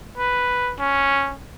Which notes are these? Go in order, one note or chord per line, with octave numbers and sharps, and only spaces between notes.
B4
C#4